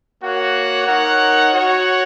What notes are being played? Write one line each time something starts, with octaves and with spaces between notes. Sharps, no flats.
A#3 F#4 C#5 F#5
D#4 A#4 C#5 F#5
F#4 C#5 F#5